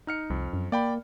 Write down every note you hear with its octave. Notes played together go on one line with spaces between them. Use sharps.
D#4 F6 C#7
C2 F2
F#2
A#3 D5 G5 B5